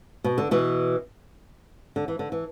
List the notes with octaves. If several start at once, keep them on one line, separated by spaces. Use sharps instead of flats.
B2
D3
B2 E3
D3
E3
D3
E3